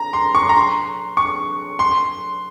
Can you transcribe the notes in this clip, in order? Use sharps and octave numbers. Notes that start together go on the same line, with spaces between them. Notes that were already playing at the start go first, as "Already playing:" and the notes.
Already playing: A#5
C6
C#6
C6
A#5
C6
C#6
C6